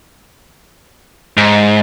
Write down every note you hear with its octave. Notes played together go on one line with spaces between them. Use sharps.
G#2